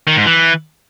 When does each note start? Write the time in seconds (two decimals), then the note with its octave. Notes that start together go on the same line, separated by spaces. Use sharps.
0.07 D#3
0.17 G#2
0.26 E3